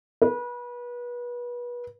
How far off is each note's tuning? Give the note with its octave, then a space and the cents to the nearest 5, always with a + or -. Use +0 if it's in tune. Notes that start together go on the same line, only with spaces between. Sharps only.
B4 -30